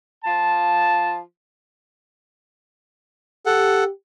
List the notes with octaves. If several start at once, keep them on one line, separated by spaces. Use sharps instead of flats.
F3 F4 A5
G4 A4 F#5